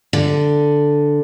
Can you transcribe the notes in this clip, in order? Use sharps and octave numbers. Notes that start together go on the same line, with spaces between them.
D3